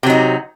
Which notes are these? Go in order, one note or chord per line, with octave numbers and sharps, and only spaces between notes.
C3 F#3 D#4